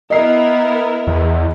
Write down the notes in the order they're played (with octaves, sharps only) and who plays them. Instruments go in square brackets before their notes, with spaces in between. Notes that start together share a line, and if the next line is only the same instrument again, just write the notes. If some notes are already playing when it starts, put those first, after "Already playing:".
[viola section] B3 E4 A#4 [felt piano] D#5 C7
[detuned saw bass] E2